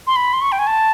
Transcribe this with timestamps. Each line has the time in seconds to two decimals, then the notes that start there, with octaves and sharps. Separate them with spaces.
0.07 C6
0.16 B5
0.33 C6
0.41 C#6
0.52 G5
0.59 G#5
0.67 A5